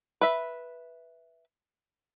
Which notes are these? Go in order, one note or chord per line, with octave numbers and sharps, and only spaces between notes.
B4 E5